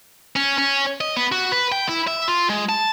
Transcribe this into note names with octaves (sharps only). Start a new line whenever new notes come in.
C#4
C#4
D#5
B3
F#4
B4
G5
E4
E5
F4
G#3
A5